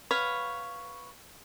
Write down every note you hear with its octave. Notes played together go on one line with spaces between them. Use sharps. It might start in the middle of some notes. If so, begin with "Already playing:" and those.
B4 C#5 F5 F#5